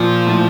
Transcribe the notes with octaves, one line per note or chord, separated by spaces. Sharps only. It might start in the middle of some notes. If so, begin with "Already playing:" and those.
Already playing: A#2 F3
A2